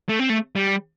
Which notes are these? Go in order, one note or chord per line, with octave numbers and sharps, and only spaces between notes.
A3
C4
A3
G3